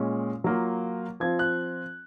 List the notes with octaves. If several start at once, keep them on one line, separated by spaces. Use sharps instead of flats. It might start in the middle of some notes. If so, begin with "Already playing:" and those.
Already playing: A#2 G#3 C#4
F#3 A#3 F4
F3 C4 F4 G#6
F#6